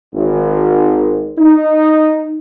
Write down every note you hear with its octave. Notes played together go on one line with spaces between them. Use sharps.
G#1
D#4